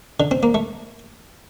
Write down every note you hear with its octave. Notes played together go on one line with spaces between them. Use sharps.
D3
C4
A#3
A3